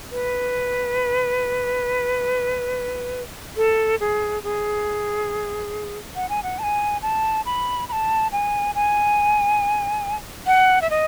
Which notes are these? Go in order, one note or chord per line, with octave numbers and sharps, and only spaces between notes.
B4
A4
G#4
G#4
F#5
G#5
F#5
A5
G#5
A5
B5
B5
A5
G#5
G#5
F#5
E5
D#5